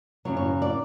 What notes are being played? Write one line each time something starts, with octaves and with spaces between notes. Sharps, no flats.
F#2 C#3 F#3 C#5
C#5
D5